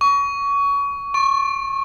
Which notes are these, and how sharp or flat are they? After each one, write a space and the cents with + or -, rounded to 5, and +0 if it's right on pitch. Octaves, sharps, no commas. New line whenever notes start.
C#6 +25
C#6 -30